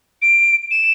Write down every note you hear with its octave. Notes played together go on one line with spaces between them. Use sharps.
D7
E7